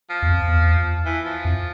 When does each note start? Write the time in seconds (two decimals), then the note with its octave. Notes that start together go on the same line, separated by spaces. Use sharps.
0.10 F3
0.22 E2
0.29 F2
0.47 E2
1.05 E3
1.25 F3
1.45 F2